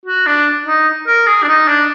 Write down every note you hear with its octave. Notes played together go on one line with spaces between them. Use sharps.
F#4
D4
D#4
A#4
G#4
D4
D#4
D4